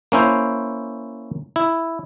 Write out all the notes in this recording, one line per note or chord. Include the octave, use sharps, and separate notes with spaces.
A#3 C#4 E4 C5
E4